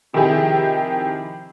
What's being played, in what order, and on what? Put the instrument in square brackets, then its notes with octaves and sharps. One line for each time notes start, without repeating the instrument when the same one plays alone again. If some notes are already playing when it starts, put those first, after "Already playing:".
[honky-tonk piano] C3 D#3 F3 E4 G4 G#4